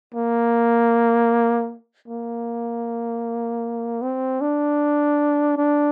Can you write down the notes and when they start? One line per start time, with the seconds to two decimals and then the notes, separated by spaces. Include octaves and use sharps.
0.14 A#3
2.08 A#3
4.02 C4
4.41 D4
5.57 D4